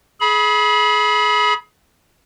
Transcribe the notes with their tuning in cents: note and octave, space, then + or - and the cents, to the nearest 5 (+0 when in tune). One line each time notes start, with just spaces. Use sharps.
G#4 +30 B5 -20